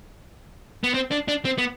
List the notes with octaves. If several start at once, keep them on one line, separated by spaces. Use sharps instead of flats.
B3
C4
D4
D4
C4
B3